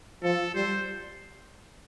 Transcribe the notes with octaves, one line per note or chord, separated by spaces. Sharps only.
F3 A4
G3 C5